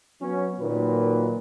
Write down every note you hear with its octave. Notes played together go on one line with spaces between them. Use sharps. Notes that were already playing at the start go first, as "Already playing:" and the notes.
F#3 B3 C#4
A#2 D#3 F#3 B4